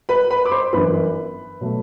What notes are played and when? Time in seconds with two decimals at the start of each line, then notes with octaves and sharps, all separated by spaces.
0.09 B4 B5
0.30 B4 B5
0.46 D6
0.51 C5 C6
0.73 G1 F#2 E3 B4 B5
1.61 B2 F#3 A3